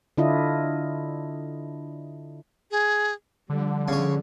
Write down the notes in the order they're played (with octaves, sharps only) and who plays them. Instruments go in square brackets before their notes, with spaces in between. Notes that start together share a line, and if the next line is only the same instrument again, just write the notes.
[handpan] D3 D4 E4 F4 D#5
[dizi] G#4
[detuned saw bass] D3 [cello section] F3 G3
[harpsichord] C#3 C#5 [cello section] F3